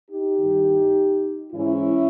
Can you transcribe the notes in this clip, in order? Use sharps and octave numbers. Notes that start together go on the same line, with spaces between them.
D#4 G4
G2 D#3
G#2 E3 C#4 E4